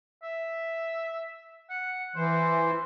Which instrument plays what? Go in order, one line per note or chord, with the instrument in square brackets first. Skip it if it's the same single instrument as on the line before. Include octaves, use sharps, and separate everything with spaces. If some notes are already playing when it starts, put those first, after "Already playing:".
[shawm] E5
F#5
[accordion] E3 [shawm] C5